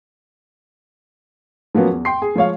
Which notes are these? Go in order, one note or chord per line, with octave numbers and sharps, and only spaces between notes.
F3 F#3 A#3 B3 C#4
E2
G5 C6 C7
G#4
F3 G#3 C#5 F5